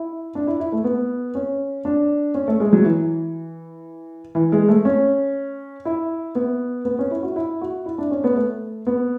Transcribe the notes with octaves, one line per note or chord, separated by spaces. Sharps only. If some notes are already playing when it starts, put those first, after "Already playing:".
Already playing: E4
D4
E4
E4
A3
B3
C#4
D4
C#4
A3
G#3
F#3
E3
E3
G#3
A3
C#4
E4
B3
B3
C#4
E4
F#4
E4
F#4
E4
D4
C#4
B3
A3
B3